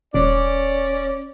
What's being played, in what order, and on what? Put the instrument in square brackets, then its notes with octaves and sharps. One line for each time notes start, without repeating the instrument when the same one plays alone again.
[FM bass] D#1 [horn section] C#4 D5